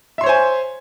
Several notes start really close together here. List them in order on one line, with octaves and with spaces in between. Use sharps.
E5 C6 C#5 C5 G#5